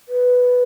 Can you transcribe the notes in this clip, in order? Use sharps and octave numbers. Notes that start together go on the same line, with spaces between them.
B4